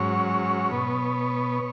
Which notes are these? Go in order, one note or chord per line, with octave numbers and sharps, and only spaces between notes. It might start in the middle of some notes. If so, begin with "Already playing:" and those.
Already playing: G#2 F#3 C#4 C#5
B2 B3